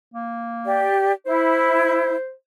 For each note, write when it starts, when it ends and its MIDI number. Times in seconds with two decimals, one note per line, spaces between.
0.14 0.86 58
0.65 1.11 67
0.65 1.11 74
1.26 2.15 64
1.26 2.32 72